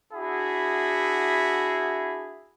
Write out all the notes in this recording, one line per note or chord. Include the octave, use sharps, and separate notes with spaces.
D4 E4 F#4 G#4 E5 B5